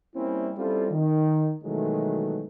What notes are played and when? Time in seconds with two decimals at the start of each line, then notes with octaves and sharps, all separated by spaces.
0.15 G3 A#3 C4 C#4 E4
0.57 G3 C4 C#4 E4 F4 A4
0.92 D#3
1.64 B2 D#3 E3 F#3 G#3 A3